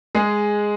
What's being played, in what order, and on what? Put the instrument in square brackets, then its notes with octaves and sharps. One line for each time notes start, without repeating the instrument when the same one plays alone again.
[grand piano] G#3 G#4